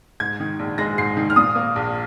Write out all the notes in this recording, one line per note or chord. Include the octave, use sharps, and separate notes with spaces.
G#2 G#6
D#3
A#1
G#3 A#6
G#2 C7
D#3
F6
A#2 D#6
A#3
A#1